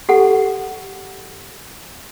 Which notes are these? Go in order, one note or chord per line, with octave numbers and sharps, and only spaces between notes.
G4 A4 F#5